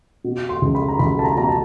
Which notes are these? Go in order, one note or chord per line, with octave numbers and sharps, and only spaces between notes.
B2
C6
C#2
B5
A#5
C#2 B5
A5
A#5
B2 A#5
A5